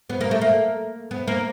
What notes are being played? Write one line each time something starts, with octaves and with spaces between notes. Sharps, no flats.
B3
A#3
A3
A#3
B3
A#3